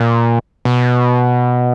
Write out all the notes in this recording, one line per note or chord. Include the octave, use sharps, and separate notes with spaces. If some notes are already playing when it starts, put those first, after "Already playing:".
Already playing: A#2
B2